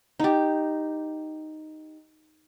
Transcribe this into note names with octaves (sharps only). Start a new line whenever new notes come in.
D#4 G4